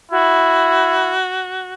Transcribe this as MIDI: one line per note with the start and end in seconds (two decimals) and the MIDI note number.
0.11 1.17 64
0.11 1.73 66